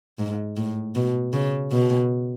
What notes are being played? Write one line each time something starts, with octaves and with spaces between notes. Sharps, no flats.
G#2
A2
B2
C#3
B2